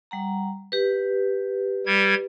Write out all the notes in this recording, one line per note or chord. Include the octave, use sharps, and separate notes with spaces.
G3 F#5 A#5
G4 B4
G3 G#6